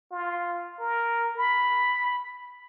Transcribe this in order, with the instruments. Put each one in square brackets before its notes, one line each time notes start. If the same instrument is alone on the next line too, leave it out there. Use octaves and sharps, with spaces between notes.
[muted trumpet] F4
A#4
B5